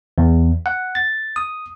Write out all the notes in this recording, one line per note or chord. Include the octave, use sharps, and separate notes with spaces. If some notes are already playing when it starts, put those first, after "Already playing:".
E2
F#5
A6
D#6